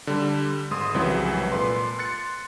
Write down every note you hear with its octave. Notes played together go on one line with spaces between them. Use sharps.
D3 G3
G#1 G#3 C6 D#6
C2 F2 C#3 E3 F#3 G#3
A#2 A4 B4 C6
C6 F#6 A6 C#7